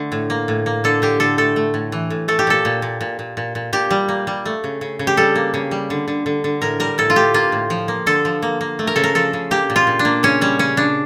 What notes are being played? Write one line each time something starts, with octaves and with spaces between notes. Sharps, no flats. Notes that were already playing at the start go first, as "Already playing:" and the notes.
Already playing: D3 A3
A2
A#3
A2
A#3
D3 A4
D3 G4
D3 A4
A3 A4
A3
A2
E3
A2
A3 A4
G4
A#2 A4
A#2
A#2
A#2
A#2
A#2
A#2
A#2 G4
G3
A#3
G3
A3
C#3
C#3
C#3
G4
G3 A4
A#3
C#3
G3
D3
D3
D3
D3
A2 A#4
G3 A#4
A2 A4
F4
A2 G4
A#3 F4
A2
F3
A#3
D3 A4
F3
A#3
A#3
A3
A#4
C#3 A4
A#4
F3 A4
C#3
A#3 G4
A#2
F4
A#2
D4
A#3
C#3 C#4
G3 C#4
C#3 C#4
C#3 D4